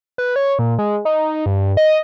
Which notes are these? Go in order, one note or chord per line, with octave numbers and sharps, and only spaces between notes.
B4
C#5
A#2
G#3
D#4
G2
D#5